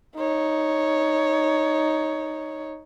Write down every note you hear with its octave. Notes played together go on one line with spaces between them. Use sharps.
D#4 C#5